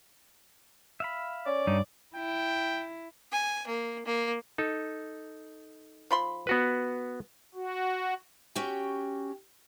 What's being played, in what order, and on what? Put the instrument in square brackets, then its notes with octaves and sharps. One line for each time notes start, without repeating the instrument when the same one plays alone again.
[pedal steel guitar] E5 F5 B5
[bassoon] C#4 [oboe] D5
[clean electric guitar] G2 [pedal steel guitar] D#4
[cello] E4 [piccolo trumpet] G5
[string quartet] G#5
A#3
A#3
[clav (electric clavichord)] D#4 A4
[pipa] F3 B5 C6
[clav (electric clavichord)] B3 F#4 B4
[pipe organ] F#4
[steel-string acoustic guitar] C#4 F#4 G4 G5